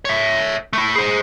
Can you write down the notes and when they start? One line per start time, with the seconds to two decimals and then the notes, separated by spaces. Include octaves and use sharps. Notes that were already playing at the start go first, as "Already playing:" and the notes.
0.05 C#5 E5
0.73 A3 E4
0.95 G#4 C5